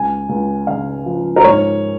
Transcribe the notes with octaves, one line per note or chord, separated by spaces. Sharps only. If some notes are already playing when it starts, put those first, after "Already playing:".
Already playing: C#2 G#5
C#2
C#3 F5
F3
A#4
G#2 C#5